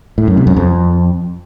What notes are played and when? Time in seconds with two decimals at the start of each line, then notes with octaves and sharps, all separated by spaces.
0.18 A2
0.27 F#2
0.37 C3
0.47 F#2
0.56 F2